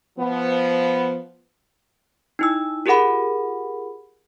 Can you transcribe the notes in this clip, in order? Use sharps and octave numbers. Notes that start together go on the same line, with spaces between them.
F3 B3
D#4 E4 E6
F4 G4 G#4 A#4 F#5 B5